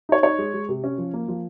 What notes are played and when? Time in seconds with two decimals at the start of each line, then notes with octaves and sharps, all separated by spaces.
0.09 D#4 C#5
0.23 D#4 C#5
0.39 G#3
0.54 G#3
0.69 C3
0.84 C#4
0.98 F3
1.14 A#3
1.28 F3